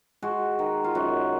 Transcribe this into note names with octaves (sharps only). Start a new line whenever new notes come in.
G#3 F#4
D#3
F4
F#2 F#4